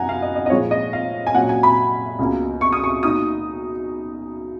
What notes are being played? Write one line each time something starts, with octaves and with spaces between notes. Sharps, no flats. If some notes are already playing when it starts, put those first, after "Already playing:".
Already playing: F#2 B3 D#4 F#5 G#5 A#5
F5
D#5
D#5
D#5
A#2 F3 G#3 C#5
D#5
F5
G#5
A#2 F#3 C#4 F#5
G#5
B5
C#2 B2 A#3
C#6
D#6
C#6
B2 A#3 D#4 D#6